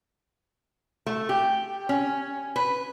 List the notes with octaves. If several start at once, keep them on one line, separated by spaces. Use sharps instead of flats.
A3
G4
C#4
B4